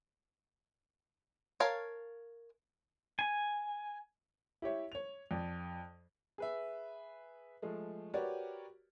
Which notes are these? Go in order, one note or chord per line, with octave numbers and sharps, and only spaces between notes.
A#4 C#5 F5 A5
G#5
E4 G4 C#5 E5
C#5 F7
F2 D5
G#4 B4 E5
F3 G#3 A3
F#4 G4 A#4 B4 C#5 D5